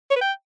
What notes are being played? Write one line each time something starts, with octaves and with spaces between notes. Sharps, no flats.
C#5
B4
G5